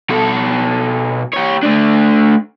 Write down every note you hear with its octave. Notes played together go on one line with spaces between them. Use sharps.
B2 A4
G4 C#5
A3 D4